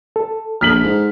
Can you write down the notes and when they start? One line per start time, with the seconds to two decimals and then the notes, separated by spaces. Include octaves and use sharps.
0.16 A4
0.61 A#1 F6 B6 F#7
0.83 G#2